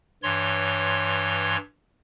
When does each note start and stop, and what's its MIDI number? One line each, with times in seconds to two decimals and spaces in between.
0.23 1.57 43
0.23 1.57 52
0.23 1.57 73
0.23 1.57 84